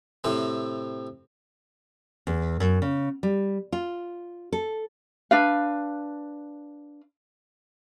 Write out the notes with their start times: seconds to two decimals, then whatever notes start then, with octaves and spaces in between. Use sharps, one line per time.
0.24 A2 C3 C4
2.27 E2
2.60 F#2
2.82 C#3
3.23 G3
3.72 F4
4.52 A4
5.31 D4 B4 F5